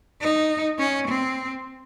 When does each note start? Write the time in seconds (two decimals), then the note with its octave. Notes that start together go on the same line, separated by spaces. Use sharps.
0.21 D#4
0.79 C#4
1.08 C4